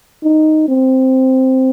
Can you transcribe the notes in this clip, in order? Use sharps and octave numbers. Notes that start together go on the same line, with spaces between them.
D#4
C4